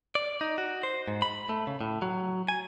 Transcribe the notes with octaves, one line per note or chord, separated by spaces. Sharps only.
D5
D#4
F#4
C5
G#2
B5
A3
C#3
A2
F#3
G#5